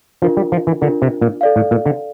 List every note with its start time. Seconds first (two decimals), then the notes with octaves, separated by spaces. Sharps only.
0.22 F3 D4 F4 A#4
0.37 G3
0.52 F3
0.67 E3
0.81 D3 D4 F4 A#4
1.02 C3
1.21 A#2
1.41 A4 D5 F5
1.56 A2
1.71 A#2
1.86 D3